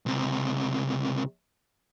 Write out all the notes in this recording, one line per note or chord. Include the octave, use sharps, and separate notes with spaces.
C#2 C3